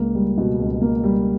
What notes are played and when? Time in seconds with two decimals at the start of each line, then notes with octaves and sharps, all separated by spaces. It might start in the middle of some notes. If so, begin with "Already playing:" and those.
Already playing: C#2 A#3
0.15 G3
0.38 B2
0.59 C#2
0.81 A#3
1.04 G3